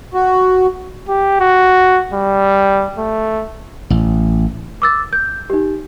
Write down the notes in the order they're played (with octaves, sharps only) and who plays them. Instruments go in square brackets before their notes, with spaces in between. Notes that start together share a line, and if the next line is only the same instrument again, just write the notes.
[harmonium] F#4
[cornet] G4
F#4
G3
A3
[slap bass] A1
[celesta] D6 E6 A6
G6
D#4 G4